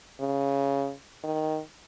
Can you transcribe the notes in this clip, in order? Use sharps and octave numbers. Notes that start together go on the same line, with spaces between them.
C#3
D#3